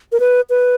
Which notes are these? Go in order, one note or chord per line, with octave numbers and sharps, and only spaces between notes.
A#4
B4
B4